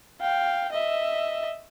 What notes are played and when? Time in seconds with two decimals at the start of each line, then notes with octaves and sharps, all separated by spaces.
0.21 F5 G5
0.72 D#5 E5